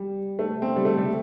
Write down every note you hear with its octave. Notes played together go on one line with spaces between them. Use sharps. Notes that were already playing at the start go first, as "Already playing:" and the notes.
Already playing: G3
A3
C4
G3
A3
G3